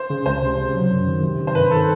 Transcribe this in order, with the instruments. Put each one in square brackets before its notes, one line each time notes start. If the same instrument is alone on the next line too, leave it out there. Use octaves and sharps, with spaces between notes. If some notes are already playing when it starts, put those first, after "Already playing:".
Already playing: [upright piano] C5
[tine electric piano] C#3
[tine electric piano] C#2 [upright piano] C5
[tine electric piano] C3
C#3
F#3
F#2
D#3
C3
D#3
[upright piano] C5
[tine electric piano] G2 [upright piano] B4
[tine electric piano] D#3 [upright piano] A4